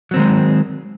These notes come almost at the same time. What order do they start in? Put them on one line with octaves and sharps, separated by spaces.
F#3 C4 D#3 G#3